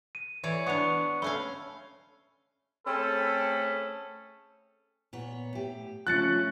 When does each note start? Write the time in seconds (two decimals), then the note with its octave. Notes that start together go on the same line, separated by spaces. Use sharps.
0.15 D#7
0.43 E3 C#5 D5
0.67 B3 D4 C#6 C#7 F7
1.22 A3 C#4 F5 B5 G7
2.87 A3 C4 C#4 G#4 A4 B5
5.13 A#2 B3 C#5
5.53 A2 G4
6.07 C#3 F3 A3 C#4 F4 F#6 A6 C#7